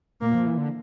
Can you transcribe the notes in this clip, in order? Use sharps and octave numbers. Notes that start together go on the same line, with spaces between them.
A#2 A#3
F3
E3
D3